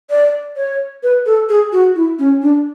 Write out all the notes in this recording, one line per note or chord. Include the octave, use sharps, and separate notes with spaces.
D5
C#5
B4
A4
G#4
F#4
E4
C#4
D4